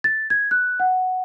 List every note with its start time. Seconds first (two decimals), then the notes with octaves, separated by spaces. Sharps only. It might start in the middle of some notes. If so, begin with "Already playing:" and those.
0.04 A6
0.30 G#6
0.51 F#6
0.80 F#5